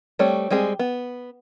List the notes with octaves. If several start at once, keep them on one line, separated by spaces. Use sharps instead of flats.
G3 A3 C4 C#5
G3 G#3 C4 G#4
B3